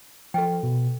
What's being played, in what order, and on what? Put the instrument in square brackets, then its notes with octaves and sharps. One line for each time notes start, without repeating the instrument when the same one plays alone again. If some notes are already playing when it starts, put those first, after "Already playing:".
[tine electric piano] F3 [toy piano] A4 G5
[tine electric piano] B2